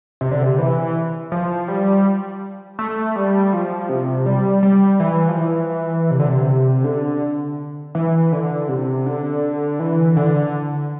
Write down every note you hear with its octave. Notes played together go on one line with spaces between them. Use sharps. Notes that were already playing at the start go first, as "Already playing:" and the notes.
C3
D3
C3
E3
F3
G3
A3
G3
F3
C3
G3
G3
E3
F3
E3
C3
D3
C3
D3
E3
D3
C3
D3
E3
D3